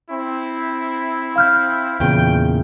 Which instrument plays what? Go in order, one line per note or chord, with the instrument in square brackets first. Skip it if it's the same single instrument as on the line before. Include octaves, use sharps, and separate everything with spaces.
[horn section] C4 E4
[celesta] F5 F6 G6
[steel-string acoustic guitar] E2 A#2 C#3 [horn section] G5